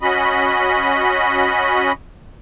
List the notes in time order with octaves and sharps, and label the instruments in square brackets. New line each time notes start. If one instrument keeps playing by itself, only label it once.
[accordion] C#4 F#4 D#5 B5